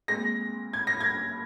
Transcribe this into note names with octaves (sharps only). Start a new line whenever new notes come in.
A#2 G#3 C4 A#6
G#6
A#6
G#6